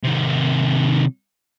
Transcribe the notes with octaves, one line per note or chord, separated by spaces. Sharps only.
C3 D#3